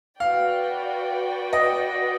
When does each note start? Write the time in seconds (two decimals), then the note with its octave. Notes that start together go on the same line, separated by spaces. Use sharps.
0.20 F#4 B4 D5 F5 G5
1.53 D#5